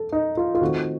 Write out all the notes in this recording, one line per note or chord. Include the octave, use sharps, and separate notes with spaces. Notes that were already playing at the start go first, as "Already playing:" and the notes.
Already playing: A4
D#4
F4
F4
D#3 A3 C4 F#4